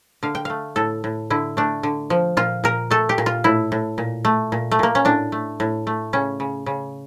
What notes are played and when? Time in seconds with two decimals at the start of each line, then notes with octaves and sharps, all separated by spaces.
0.23 D3 F5
0.35 G5
0.45 A3 F5
0.76 A2 A4
1.04 A2
1.30 D3 E4
1.57 A3 D4
1.83 D3
2.10 F3
2.37 A#2 F4
2.64 A#2 A#4
2.91 A3 A4
3.09 G4
3.18 A#2
3.26 F4
3.44 A2 E4
3.72 A2
3.98 A#2
4.25 A3
4.52 A#2
4.71 A3
4.79 A#2 A#3
4.95 C#4
5.05 A2 D4
5.32 A3
5.60 A2
5.87 A3
6.13 C#3 C#4
6.40 C#3
6.66 C#3